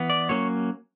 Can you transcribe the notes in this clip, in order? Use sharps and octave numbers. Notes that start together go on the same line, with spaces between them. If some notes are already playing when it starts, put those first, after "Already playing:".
Already playing: E3 B3
D5
F#3 A#3 C#4 C#5